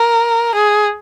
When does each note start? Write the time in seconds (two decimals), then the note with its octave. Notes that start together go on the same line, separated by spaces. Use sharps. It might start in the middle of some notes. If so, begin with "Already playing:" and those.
Already playing: A#4
0.55 G#4